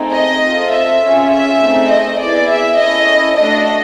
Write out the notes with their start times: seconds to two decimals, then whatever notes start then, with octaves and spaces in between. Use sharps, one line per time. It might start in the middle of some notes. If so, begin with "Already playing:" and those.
Already playing: A3 C4 D#4 G#4
0.14 D#5
0.44 C4 F4 A4
0.73 E5
1.03 C#4 F4 G#4
1.32 E5
1.62 A3 C4 D#4 G#4
1.92 D#5
2.21 B3 E4 G#4 D5
2.50 E5
2.80 C#4 E4 A4 D#5
3.39 A3 D4 F#4 D#5